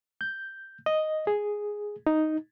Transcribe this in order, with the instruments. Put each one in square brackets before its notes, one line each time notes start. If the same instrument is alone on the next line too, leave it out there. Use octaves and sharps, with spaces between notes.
[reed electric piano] G6
D#5
G#4
D#4